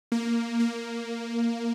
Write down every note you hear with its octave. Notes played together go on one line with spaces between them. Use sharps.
A#3
A#3